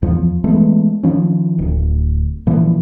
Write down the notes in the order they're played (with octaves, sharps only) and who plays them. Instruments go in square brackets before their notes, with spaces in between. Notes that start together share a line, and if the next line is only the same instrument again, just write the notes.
[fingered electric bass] E2 F3
E3 G#3 A3 B3
D#3 F3 C#4
D1
A#2 E3 F3